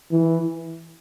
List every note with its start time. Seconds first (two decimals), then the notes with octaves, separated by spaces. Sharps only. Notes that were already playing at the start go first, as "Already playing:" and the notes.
0.11 E3